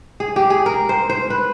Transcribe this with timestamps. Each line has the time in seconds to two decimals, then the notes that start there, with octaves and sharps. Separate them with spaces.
0.20 G#4
0.36 G4
0.50 G#4
0.66 A#4
0.89 C5
1.10 C5
1.30 B4